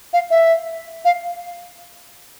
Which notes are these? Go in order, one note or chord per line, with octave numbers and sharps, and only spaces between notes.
F5
E5
F5